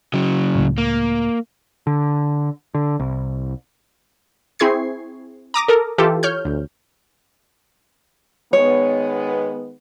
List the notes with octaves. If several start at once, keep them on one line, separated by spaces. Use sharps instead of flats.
C#3 F#3
C#2 A2
A#3
D3
D3
C2
C4 E4 G#4 C#6 G#6 C7
A#5 D6 D#6 A#6
A4 A#4
E3 F4 G4 A4
C#5 F6 G6
D2
D#3 G#3 B3 C#5